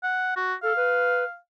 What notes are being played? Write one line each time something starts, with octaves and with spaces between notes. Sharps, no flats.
F#5
F#4
A4 F5
B4